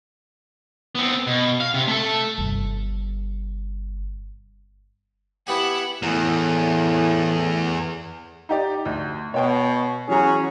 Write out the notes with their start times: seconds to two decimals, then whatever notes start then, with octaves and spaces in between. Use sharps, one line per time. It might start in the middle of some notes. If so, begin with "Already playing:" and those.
0.95 B3 C4
1.27 B2
1.60 F5
1.74 C3
1.88 A3 A4
2.38 G1 C3
5.47 B3 E4 G4 F#5 G#5
6.03 E2 A2
8.49 D#4 G4 D5
8.85 D2
9.34 B2 C#5 G5
10.09 E3 F#3 C#4 F#4 G#4 A#5